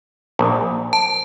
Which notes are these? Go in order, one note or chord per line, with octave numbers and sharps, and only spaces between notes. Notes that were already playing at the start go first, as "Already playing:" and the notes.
A#1
A5